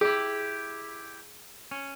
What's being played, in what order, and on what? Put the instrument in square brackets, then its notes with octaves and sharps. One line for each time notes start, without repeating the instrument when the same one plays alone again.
[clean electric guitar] E4 G4 [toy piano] G#4
[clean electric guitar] C#4